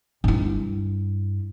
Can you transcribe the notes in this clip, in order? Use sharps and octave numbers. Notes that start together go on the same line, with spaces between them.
G2 E4